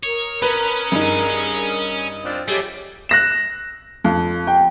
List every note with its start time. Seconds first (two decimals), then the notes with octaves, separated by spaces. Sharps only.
0.03 A#4 C#5 D#6
0.42 C#4 B4 A#5 B5
0.92 G2 D#4 G#4 A#5
2.25 C4 D4 F4
2.48 F3 G3 A3 G4 G#4 C#5 D#5
3.09 F#6 A#6 E7
4.04 F2
4.47 G5